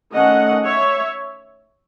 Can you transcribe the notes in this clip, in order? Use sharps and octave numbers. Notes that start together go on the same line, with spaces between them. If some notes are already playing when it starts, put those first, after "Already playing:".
D#3 A3 C#4 D#5 F#5
C#5 E5